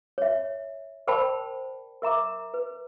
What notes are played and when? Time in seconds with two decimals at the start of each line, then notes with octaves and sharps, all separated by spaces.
0.18 C#5 E5
1.07 A#4 C5 D5 G5 A5 B5
2.02 A#4 E5 A#5 D6
2.54 B4